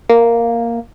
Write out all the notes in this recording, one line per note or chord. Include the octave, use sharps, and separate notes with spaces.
A#3